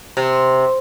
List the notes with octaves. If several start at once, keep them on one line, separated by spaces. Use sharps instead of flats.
C3